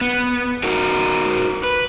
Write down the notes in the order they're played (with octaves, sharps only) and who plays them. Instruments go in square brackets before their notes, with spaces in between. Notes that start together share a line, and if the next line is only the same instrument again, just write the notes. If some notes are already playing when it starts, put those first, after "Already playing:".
[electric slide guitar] B3
D#4 F#4 A#4
B4